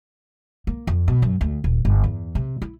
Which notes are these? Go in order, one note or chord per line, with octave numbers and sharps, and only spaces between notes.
A#3
F2
B2
F#2
D2
D#1
G1
E2
C3
E4